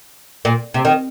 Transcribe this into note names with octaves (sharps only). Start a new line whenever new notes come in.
A#2
C3
D#3